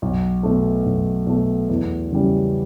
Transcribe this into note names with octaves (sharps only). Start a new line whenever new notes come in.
B1
B2 A3
B1
B2 A3
E2
C#3 E3 G3 C#4